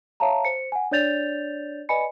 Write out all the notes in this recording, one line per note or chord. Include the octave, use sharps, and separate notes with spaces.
C#5 E5 F5 A5 A#5
C5 C#7
F#5 G#5
D4 C#5 D5 G6 A6 F7
B4 D5 D#5 G#5 B5 C#7